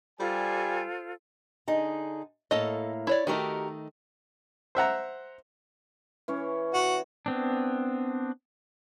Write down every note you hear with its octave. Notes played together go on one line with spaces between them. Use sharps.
G3 F4 A4 C5 G#5
D3 D#4 G#4
A2 A#3 A4 D#5
E4 C#5 D5
D#3 A3 D#4 F#4 G4 A#4
C5 E5 F#5 A#5
E3 C#4 C#5
F#4
B3 C4 D4